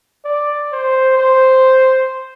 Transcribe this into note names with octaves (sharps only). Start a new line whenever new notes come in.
D5
C5
C5